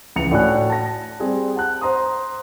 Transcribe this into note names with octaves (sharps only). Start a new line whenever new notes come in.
C#2 E3 C#7 F7
A2 D4 F#4 G#5 F#6
A5 A#6
G3 C4 G#4
F#5 A5 F#6
C5 A#5 C6 D#6